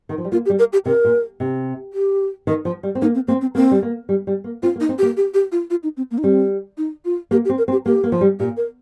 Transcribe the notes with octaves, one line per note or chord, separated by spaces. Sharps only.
D#3
F3
G3
A#3 F4
G4
G3
A#4
G4
C3 A#4
A#2
C3
G4
D#3
F3
G3
C4
A#3 D#4
C4
A#3 C4
C4
A#3 C4
G3
A#3
G3
G3
A#3
C4 F4
A#3
D#4
C4
G4
A#3
G4
G4
F4
F4
D#4
C4
A#3
D#4
G3 C4
D#4
F4
A#3 G4
G4
C4
A#4
C4
G4
A#3 G4
A#3
F3
G3
A#2 G4
A#4